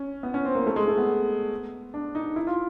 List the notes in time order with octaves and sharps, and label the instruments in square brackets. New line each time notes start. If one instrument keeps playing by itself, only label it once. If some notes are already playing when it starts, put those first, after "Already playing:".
Already playing: [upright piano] C#4
B3
C#4
C4
A#3
A3
G#3
A3
B3
D4
D#4
E4
F4